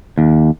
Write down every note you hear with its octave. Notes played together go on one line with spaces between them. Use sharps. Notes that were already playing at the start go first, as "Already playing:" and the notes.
D#2